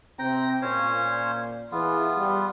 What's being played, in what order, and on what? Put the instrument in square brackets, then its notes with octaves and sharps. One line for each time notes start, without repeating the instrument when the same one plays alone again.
[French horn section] C3 C4 [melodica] G5 A#5
[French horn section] A#2 [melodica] C#4 C5 C#5
[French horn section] E3 G#4 [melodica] B3 F4
[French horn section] G3